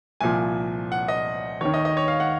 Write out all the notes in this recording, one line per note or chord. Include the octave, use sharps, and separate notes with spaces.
C2 A#2 F3 G#5
F#5
D#5
D#2 D#3 C#5
D#5
D#5
C#5
F5
F#5